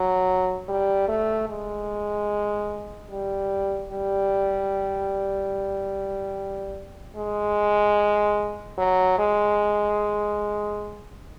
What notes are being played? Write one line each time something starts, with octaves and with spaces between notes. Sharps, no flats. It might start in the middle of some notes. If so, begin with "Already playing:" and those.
Already playing: F#3
G3
A3
G#3
G3
G3
G#3
F#3
G#3